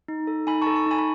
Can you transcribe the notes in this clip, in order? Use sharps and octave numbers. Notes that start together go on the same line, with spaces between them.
D#4
A4
D#4 G#5 B5
A4 A5 C#6
A5 C#6
D#4 G#5 B5
B5